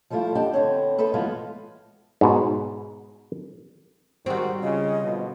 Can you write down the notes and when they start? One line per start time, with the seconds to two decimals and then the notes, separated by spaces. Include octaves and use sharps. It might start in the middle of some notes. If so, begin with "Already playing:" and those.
0.10 F3 G3 A3 E4 F4
0.35 D4 G4 D#5 F#5
0.53 D3 B3 C4 C#5
0.98 G#4 A4 B4 C5 E5
1.14 E3 F3 G#3 B3 F4 F#4
2.21 G#2 B2
4.26 D#3 G3 G#3 C4 F#4
4.63 C#3 F4 D#5
5.03 B2 D3 F3